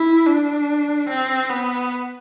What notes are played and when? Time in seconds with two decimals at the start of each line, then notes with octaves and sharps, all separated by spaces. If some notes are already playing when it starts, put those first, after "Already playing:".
Already playing: E4
0.26 D4
1.09 C4
1.50 B3